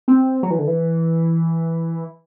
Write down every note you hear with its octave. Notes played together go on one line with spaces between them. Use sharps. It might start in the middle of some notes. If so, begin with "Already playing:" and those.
C4
F#3
E3
D3
E3